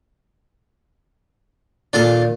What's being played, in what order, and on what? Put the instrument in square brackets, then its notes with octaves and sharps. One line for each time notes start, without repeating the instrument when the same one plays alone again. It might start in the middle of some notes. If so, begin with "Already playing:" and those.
[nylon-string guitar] D#2 A#2 D#3 [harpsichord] D4 F4 A4